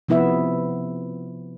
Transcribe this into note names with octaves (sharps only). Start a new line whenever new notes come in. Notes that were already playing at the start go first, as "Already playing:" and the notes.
C3 F3 B3 E4 E5